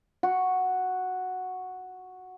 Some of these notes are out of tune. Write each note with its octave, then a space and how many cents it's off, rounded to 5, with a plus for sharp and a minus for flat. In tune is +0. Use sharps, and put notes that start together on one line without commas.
F#4 -5